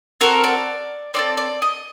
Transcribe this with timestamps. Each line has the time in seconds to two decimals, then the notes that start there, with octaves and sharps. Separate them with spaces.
0.21 C4 F#4 A4 A#4
0.44 D5
1.14 C4 D#4 A4 D5
1.37 D5
1.62 D#5